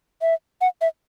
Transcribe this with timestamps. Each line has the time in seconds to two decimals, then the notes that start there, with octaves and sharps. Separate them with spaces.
0.22 E5
0.61 F#5
0.81 E5